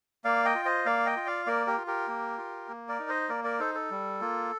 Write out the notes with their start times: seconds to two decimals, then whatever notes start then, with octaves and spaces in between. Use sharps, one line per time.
0.25 A#3 D5 F5
0.45 D#5 G5
0.55 F4
0.65 C5 D#5
0.86 A#3 D5 F5
1.06 D#5 G5
1.16 F4
1.27 D5 F5
1.47 A#3 A#4 D5
1.66 G4 A#4
1.77 F4
1.87 G4 A#4
2.08 A#3
2.38 F4
2.68 A#3
2.89 A#4 D5
3.00 D#4
3.09 C5 D#5
3.29 A#3 A#4 D5
3.44 A#4 D5
3.60 D#4 A4 C5
3.75 A4
3.91 G3
4.21 A#3 F4